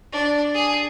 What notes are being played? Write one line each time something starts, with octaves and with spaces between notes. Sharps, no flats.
D4
G#4